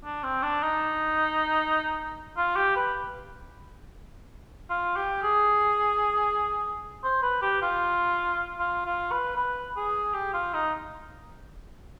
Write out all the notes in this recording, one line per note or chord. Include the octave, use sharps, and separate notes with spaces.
D4
C4
D4
D#4
F4
G4
B4
F4
G4
G#4
C5
B4
G4
F4
F4
F4
B4
B4
G#4
G4
F4
D#4